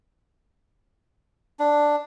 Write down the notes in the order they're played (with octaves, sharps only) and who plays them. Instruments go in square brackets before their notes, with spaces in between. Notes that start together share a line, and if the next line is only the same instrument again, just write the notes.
[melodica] D4